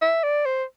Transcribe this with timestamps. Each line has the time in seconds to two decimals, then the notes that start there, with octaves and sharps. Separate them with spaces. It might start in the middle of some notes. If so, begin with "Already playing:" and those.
0.02 E5
0.23 D5
0.46 C5